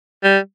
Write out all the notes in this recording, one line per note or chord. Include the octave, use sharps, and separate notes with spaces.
G3